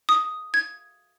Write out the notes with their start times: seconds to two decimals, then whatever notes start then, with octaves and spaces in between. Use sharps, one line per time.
0.09 D#6
0.54 G#6